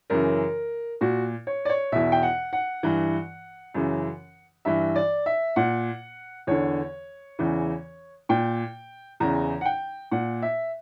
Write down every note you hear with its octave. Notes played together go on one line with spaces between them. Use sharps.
F#2 C#3 E3 A#4
A#2 F#4
C#5
D5
C#5
E2 B2 E5
G5
F#5
F#5
G2 E3
F#2 C#3 E3
G2 E3 E5
D5
E5
A#2 F#5
E2 D3 C#5
E2 C#3 E3
A#2 G5
E2 C#3 E3 A#5
F#5
G5
A#2 F#5
E5